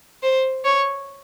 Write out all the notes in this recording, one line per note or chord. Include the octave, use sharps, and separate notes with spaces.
C5
C#5